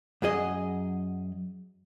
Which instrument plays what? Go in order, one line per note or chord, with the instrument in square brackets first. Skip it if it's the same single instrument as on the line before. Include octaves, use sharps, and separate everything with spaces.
[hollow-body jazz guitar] F#2 F#3 G#4 D#5